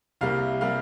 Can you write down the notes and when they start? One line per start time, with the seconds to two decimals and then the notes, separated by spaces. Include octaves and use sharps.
0.21 C2 C3 G3 A#3 F5
0.61 C3 G3 A#3 F5